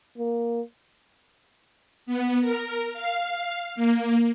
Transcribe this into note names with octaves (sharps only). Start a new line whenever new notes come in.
A#3
B3
A#4
F5
A#3